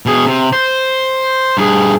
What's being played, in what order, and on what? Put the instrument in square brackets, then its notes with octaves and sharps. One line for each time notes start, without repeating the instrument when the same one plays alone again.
[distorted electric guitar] B2 G#4
C3
C5
G2 G#4